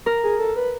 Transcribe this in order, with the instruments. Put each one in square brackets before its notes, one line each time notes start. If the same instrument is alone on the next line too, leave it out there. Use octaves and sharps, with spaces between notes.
[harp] A#4
[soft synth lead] G#4
A4
B4